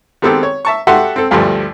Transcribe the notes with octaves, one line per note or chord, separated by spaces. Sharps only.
D#3 G#3 B3 C4 G4 A4
C#5
E5 A5 C#6
F#4 G4 A4 E5 F#5 C6
C4 A4
D2 G2 F3 G3 A3